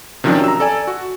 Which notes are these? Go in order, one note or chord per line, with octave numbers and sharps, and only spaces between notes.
C3 D#3 F3 F#3 C#4 D4
A#5 E6
A4 D5 G#5
F#4